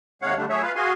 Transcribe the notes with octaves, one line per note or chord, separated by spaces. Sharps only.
D#2 C3 G#3 C#5 F5 F#5
D3 G3 A3 D4
F#3 A3 G#4 C#5 E5
F4 B4 F5
F#4 G#4 F5 G#5 C6